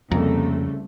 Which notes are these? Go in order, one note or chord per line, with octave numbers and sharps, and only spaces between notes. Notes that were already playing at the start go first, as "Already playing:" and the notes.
C2 F2 C#3 A3 A#3 A#5